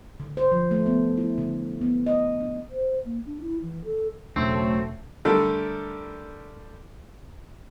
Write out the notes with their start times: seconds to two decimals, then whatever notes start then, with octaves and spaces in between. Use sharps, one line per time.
0.20 D3
0.37 C5
0.52 F3
0.71 A3
0.86 B3
1.17 E4
1.38 D3
1.81 B3
2.06 D#5
2.41 D4
2.69 C5
3.05 A#3
3.26 D4
3.41 E4
3.62 E3
3.85 A4
4.36 E1 C#3 F#3 A3 C4 D4
5.25 D3 G3 A3 A4 A#4